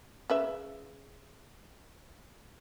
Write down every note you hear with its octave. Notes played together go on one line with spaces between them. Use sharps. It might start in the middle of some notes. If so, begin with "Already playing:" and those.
C#3 B4 E5